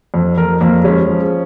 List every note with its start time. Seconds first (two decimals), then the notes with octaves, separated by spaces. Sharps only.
0.14 F2
0.37 F2 A#4
0.61 F2 A#3
0.84 G#3 C#4
1.09 F3